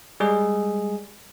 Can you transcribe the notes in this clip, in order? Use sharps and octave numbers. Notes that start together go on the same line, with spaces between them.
G3 G#3 G#4